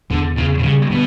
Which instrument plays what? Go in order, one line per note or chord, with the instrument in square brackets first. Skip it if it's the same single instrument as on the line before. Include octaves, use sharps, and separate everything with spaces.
[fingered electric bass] E2 [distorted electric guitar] D3
[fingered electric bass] E2 [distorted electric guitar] C#3
[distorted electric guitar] B2
[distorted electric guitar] C#3 [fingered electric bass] G3
[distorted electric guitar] B2 [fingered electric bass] D3